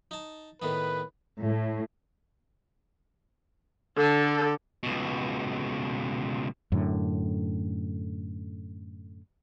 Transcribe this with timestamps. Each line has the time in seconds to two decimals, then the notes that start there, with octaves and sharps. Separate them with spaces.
0.11 D#4 A5
0.62 A2 D#3 B3 B4
1.42 A2
3.97 D3 A4
4.83 C#2 B2
6.72 F#2 A2 D3